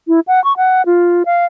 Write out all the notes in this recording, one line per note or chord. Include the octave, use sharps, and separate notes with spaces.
E4
F#5
C#6
F#5
F4
F5